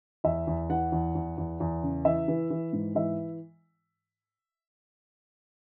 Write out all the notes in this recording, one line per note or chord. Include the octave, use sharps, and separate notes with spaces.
E2 E5
E2
E3 F#5
E2
E2
E2
E2
C#3
E3 E5
E3
E3
G#2
E3 E5